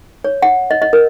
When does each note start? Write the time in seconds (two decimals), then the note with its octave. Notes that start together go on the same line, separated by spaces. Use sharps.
0.24 C#5
0.42 F#5
0.71 D#5
0.82 D#5
0.93 A#4